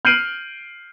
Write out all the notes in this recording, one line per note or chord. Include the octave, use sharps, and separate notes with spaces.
F6 G6 C7 D7 D#7 F#7